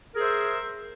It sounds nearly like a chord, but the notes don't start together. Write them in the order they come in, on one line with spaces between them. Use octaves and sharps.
A#4 G#4 C5 E5